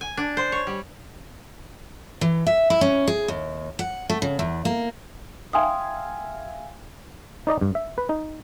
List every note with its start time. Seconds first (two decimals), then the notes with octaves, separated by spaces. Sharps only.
0.01 G#5
0.17 D4
0.37 C5
0.52 C#5
0.67 G3
2.21 E3
2.47 E5
2.70 E4
2.81 C#4
3.08 G#4
3.28 D#2
3.79 F#5
4.10 A3
4.22 C#3
4.39 E2
4.65 A#3
5.53 E5 F5 G5 G#5 C6 D#6
7.47 D#4 D5 D#5 A#5
7.61 G2
7.75 E5
7.98 B4
8.09 D#4